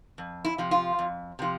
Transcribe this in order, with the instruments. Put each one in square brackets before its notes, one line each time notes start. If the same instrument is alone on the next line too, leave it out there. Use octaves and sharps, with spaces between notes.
[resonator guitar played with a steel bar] F2
E4
C3 F3
F4
F2
C3 F3